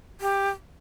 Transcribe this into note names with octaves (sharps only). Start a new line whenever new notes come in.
G4